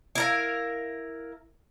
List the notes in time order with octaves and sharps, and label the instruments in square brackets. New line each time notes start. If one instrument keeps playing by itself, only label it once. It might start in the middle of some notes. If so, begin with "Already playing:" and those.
[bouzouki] E4 A#4 F5